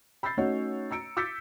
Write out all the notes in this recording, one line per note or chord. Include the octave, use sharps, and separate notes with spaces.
B5 E6 G6 A6 C7
A3 C#4 D#4 F#4 C#5 F#5
A#5 E6 C#7 D7
D6 E6 G6 A6 B6 C#7